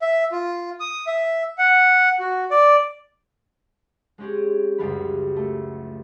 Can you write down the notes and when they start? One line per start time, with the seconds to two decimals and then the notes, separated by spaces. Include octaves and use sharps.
0.02 E5
0.32 F4
0.80 D#6
1.07 E5
1.58 F#5
2.20 F#4
2.51 D5
4.18 G#3 C4 C#4 G4 G#4
4.78 C#2 F#2 F3 G3 B3 B5
5.36 A3